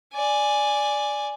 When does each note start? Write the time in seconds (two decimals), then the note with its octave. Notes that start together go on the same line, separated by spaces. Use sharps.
0.14 D5 G#5